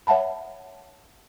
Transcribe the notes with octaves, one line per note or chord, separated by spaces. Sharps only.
C#5 E5 F#5 A5 B5